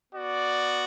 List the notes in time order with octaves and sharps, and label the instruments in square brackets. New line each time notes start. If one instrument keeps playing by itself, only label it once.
[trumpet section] B3 F#4 D5